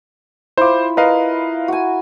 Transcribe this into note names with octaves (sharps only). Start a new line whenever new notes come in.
E4 F4 C5 D6
A#4 B4 D#5 F5
F#4 G#5